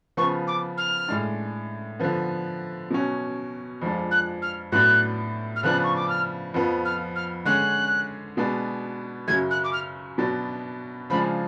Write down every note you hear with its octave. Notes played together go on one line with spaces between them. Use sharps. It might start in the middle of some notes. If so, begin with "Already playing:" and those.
C#3 F3 B3 C#6
D6
F6
A2 G#3 D4
D3 F3 B3
B2 F#3 C#4
F2 F3 G#3 D4
F#6
F6
A2 F#3 B3 D4 F#6
F6
C#3 F3 B3 D4 F#6
C#6
D6
F6
F2 F3 B3
F6
F6
D3 G#3 C#4 F#6
B2 G#3 B3 D4
F#2 C#3 F#3 G#6
F#6
D6
F6
B2 F#3 B3 D4
C#3 F3 G#3 D4 B5